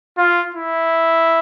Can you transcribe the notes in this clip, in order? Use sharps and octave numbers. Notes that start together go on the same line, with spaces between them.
F4
E4